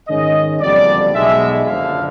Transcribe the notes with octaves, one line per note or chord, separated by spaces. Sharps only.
G#2 D#3 G#3 C#4 D#5
F#1 F2 D3 G3 D5
B1 B2 G#3 E5
F#1 F2 D3 F5